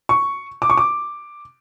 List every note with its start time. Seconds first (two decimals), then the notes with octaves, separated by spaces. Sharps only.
0.09 C#6
0.62 D6
0.70 C#6
0.77 D6